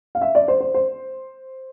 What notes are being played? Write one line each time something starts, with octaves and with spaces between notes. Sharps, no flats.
F5
E5
D5
C5
C5
C5